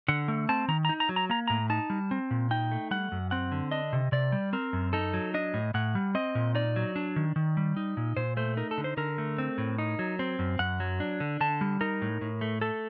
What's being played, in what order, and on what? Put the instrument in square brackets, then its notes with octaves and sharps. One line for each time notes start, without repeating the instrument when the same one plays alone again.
[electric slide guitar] D3 F#5
A3
C4 A5
D#3 A#5
A#5
D#4
A#5
F#3
A#5
A#3 A#5
A2 A#5
D#4 A5
G3
C4
A#2
D#4 G5
A3
G3 F#5
F#2
C4 F#5
D3
D4 D#5
C3
C3 D5
G3
C4 A#4
F#2
D#4 A4
F#3
D4 D#5
A2
A2 F#5
G3
C4 D#5
A#2
D#4 D5
F#3
D4
D#3
D#3
G3
D#4
A#2
A#2 C5
A3 C5
D#4 A#4
A4
D3
C5
D3 A#4
A3
C4
A2
D#4
F#3
C4
F#2
F#2 F#5
F#3
D4
D3
D3 A5
G3
D#4 A#4
A2
A2
A3
A3 A4